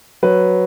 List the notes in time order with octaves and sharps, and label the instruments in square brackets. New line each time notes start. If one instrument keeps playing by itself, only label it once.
[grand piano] F#3 B4